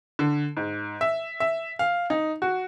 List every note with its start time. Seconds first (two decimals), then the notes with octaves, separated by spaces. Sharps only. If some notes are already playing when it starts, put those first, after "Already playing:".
0.19 D3
0.57 G#2
1.01 E5
1.40 E5
1.79 F5
2.10 D#4
2.42 F#4